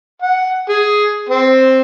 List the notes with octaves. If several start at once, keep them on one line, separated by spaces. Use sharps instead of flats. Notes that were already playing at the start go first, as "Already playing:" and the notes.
F#5
G#4
C4